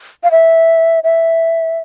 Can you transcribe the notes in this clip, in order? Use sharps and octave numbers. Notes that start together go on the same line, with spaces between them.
F5
E5
E5